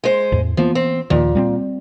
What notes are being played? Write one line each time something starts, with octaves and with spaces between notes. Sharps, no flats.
G#3 C5
E2 A2
E3 F3 A#3 B3
C4
D#2 A#2 D#3 F3
G3 B3 C4